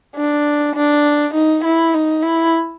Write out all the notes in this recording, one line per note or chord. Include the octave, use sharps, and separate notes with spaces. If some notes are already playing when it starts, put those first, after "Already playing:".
D4
D4
D#4
E4
D#4
E4